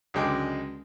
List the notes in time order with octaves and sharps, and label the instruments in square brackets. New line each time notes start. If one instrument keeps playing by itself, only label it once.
[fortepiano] C#2 D3 F#3 G#3 G5 D6